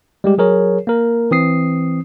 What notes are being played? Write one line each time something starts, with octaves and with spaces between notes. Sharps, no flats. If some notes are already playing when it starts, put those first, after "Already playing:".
G3 G#3 G4
F#3 G#4 A#4 C#5
A#3 A#4
E3 C4 D#6 C7